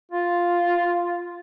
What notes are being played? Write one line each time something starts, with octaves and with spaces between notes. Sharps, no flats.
F4